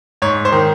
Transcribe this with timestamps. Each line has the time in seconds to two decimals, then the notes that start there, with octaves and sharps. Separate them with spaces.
0.22 G#2 C#5
0.45 C5
0.52 D#3